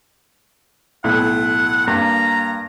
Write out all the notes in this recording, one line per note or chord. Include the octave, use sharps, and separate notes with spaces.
B1 A2 F#5
G2 A#3 A#5